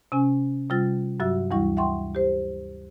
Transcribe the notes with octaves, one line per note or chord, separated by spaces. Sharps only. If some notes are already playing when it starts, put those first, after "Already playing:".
C3 C#4 G#5
C3 G3 F4 A6
G2 F#3 F#4 E5 E6
D2 E3 G3 E4 C#6
E5 F#5 G5 C6 C#6
G4 C5